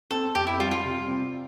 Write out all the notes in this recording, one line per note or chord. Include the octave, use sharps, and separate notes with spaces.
C4 A4
F2 G4
E4
G3 F4
F4
C3
C4